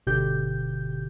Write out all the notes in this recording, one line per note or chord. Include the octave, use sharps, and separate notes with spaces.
G1 B2 D3 G4 G6